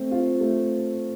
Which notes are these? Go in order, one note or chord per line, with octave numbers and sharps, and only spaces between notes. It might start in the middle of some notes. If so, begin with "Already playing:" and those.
Already playing: A3 C4
F4
A3